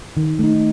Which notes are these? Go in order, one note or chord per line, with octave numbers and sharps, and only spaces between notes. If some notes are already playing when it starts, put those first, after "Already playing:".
D#3
A3 D#4